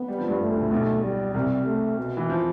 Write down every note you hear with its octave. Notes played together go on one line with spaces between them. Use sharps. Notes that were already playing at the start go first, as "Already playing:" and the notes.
Already playing: B3
G3
F3
G2 G3
A3
D2 D3
A2
B1 B2
G3
C2 C3 G3
A3
B2
E3
F3